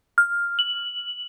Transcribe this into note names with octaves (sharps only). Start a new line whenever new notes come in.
F6
F#7